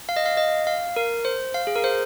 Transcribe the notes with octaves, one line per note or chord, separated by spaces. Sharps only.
F5
D#5
F5
D#5
F5
A#4
C5
F5
G#4
A#4
C5